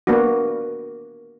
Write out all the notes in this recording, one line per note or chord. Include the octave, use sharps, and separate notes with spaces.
A#3 B3 D4 F#4